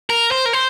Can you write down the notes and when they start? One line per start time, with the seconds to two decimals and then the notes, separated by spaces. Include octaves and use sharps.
0.10 A#4
0.32 C5
0.46 A#4
0.53 C5